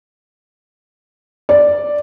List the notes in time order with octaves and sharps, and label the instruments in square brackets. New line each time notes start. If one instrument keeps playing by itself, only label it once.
[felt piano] D5